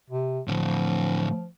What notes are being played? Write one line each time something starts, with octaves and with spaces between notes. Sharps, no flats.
C3
A2 D3 F3